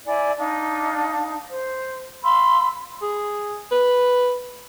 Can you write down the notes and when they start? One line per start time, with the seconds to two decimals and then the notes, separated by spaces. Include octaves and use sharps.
0.06 E4 D5 G#5
0.38 D4 D#4 F5
1.50 C5
2.24 F5 B5 C6 E6
3.02 G#4
3.72 B4